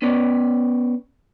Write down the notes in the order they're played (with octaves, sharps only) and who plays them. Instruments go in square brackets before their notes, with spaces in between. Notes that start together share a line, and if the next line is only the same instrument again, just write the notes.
[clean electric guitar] B3 C#4 B4 D5